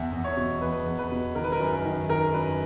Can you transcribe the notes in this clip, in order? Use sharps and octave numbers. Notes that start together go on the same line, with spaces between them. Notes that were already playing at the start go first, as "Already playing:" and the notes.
Already playing: E2 E5
E2
C#5
B2
E2 B4
E2
B4
B2
D#3 A#4
B4
A#4
F#2
A#4
D#3
D#3 A#4
F#2 B4